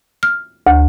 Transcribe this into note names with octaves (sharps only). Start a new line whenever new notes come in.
F6
D2